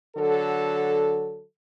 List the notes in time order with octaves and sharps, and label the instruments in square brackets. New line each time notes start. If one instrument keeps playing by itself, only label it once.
[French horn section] D3 F#3 A4